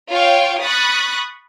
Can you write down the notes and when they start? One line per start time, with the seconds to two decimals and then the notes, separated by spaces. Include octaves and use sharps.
0.11 F4 C#5 F5 G5
0.62 B5 C#6 D#6 F#6 A6